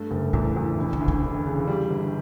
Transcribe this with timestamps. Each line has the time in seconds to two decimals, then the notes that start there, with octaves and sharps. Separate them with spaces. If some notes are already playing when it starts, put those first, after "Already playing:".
Already playing: G2 A3
0.11 F#1 F#2
0.33 E2 A2
0.56 E2
0.78 E1
0.93 D3
1.01 D2
1.08 D3
1.23 E1
1.46 C#3
1.67 G3
1.90 G1